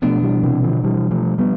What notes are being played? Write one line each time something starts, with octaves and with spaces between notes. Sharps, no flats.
B2 F3 A3 B3 D4
E3 G3
C3 E3
D3 F3
E3 G3
F3 A3
G3 B3